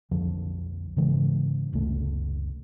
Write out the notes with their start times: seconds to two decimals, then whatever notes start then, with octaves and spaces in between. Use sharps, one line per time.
0.11 B1 F2 D3 F3
0.96 G#2 C#3 E3 G#3
1.72 F#1 C#2 C3 A3